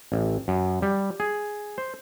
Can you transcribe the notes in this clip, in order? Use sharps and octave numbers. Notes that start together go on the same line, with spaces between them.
A1
F#2
G3
G#4
C5